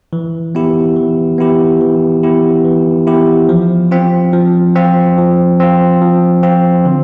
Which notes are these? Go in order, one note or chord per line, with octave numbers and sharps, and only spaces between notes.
E3
B3 E4 G4
E3
B3 E4 G4
E3
B3 E4 G4
E3
B3 E4 G4
F3
C4 F4
F3
C4 F4
F3
C4 F4
F3
C4 F4
D3